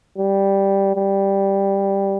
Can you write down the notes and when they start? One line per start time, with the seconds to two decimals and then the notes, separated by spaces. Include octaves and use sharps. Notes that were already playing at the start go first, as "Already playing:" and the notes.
0.18 G3
0.96 G3